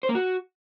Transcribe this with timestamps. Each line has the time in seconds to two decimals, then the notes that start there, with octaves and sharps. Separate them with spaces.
0.03 C5
0.09 A#3
0.15 F#4